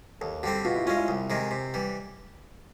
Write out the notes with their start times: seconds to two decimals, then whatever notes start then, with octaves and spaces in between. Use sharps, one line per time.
0.21 D#2 A4
0.43 D3 G3 C4 G4
0.65 B2 F4
0.76 E4
0.86 G#3 C#4 F4
0.97 E4
1.08 C2
1.30 C3 D#3 G#3
1.51 C3
1.74 E3 G3